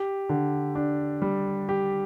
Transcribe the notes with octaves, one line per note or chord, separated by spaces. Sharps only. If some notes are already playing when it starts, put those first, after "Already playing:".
Already playing: G4
D3
D4
G3
G4